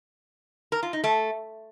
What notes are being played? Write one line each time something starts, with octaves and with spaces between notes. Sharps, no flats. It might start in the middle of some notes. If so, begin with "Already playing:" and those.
A#4
F4
D#4
A3